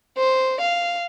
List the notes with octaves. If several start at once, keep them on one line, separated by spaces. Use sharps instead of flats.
C5
F5